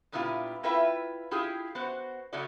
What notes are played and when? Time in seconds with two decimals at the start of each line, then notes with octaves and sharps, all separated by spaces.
0.12 G2 A#2 B3 E4 F4 G4
0.63 C4 E4 F4 B4 E5 G5
1.31 E4 F4 G4 G#4
1.75 B3 F#4 C5
2.33 C#3 F#3 A3 C#4 F#4 D5